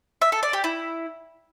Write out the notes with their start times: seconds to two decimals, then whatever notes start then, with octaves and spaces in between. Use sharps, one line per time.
0.22 E5
0.32 A4
0.43 D5
0.53 G4
0.64 E4